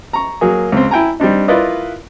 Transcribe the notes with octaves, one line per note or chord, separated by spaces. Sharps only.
A#5 C#6
F#3 A#3 G#4
C#2 C4
E4 G5 G#5 A#5
G3 C4 D4 D#4
E4 F4 A#4 B4 D5 D#5